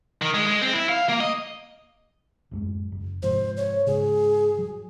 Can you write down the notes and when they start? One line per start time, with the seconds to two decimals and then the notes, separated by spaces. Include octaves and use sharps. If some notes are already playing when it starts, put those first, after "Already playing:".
0.22 D#3
0.34 G#3
0.47 G#3
0.62 C4
0.73 E4
0.89 F5
1.09 A#3
1.20 D#5
2.51 D1 F#2 G#3
2.92 F#1
3.22 G#2 C3 F3 C5
3.57 C#5
3.87 G#2 C#3 G#4
4.59 F#3